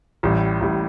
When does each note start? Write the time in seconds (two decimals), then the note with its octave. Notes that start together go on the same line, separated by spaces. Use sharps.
0.23 A1 A2 G3
0.60 A1 A2 G3